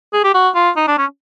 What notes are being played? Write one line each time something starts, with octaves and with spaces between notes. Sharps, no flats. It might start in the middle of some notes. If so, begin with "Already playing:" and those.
G#4
G4
F#4
F4
D#4
D4
C#4